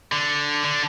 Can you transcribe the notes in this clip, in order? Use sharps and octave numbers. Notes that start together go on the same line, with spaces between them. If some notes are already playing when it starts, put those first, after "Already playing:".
D3
D3